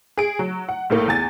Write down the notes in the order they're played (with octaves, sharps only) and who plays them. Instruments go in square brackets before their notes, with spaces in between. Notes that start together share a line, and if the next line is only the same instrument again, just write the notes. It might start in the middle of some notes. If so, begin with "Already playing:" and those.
[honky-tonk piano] G#4 D7
F#3
F#5
A#1 A2 A#3
E2 G#5 A6